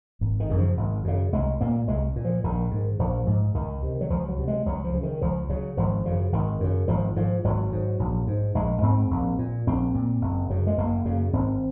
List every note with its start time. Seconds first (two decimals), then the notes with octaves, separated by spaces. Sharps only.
0.21 G#1
0.40 D#3
0.49 F#2 C#3
0.58 F3
0.77 G#1
1.04 F#2 C#3
1.32 C2 G#3
1.61 A#2 A#3
1.88 C2 G#3
2.16 A#2
2.25 F3
2.44 A#1 D#3
2.71 G#2
2.99 A#1 F3
3.26 G#2
3.54 C#2 D#3
3.82 C3
4.01 F#3
4.10 C#2 F3
4.29 F#3
4.38 C3
4.48 G#3
4.66 C#2 F#3
4.84 F3
4.94 C#3
5.03 D#3
5.21 C#2 F3
5.50 C#3 F#3
5.77 G#1 F3
6.05 F#2 C#3
6.32 G#1 D#3
6.60 F#2 C#3
6.88 G#1 F3
7.16 G#2 F3
7.45 G#1 F#3
7.72 G#2
7.99 A#1
8.27 G#2
8.55 A#1 G#3
8.82 G#2 C4
9.11 A#1
9.39 A#2
9.67 A#1 C4
9.94 A#2
10.21 F#1
10.50 F#2 C#3
10.67 G#3
10.78 F#1 A#3
11.05 F#2 C#3
11.33 G#1 C4